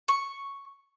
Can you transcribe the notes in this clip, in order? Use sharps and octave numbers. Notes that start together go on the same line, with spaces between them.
C#6